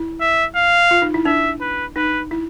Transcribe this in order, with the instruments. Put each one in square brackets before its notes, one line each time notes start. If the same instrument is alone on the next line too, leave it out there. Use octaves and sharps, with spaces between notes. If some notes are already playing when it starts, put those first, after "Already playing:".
Already playing: [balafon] E4
[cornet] E5
F5
[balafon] F4
D#4
E4
[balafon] D4 [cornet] E5
[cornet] B4
[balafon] D#4 [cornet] B4
[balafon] E4